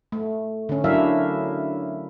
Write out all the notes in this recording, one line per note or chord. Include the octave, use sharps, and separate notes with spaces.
A3
D3 C#4
F#3 D4 E4 A#4 E5 F5